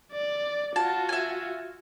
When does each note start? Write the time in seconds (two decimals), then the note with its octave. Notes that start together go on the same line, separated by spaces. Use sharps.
0.13 D5
0.76 F4 F#4 A5
1.09 E5 G#5